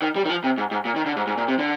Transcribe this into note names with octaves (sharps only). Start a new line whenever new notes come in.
D#3
G3
D#3
F3
C3
G#2
G#2
A#2
D#3
D3
G#2
G#2
A#2
C3
D3